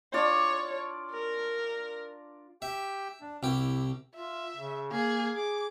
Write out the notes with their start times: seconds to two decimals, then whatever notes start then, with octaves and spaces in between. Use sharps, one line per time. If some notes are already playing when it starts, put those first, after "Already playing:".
0.13 D4 F4 C#5 D5
1.11 A#4
2.62 G4 E5 G5
3.21 D4
3.43 C2 E4 G4
4.15 F4 E5
4.56 C#3
4.92 A#3 G#4
5.36 G#4 D6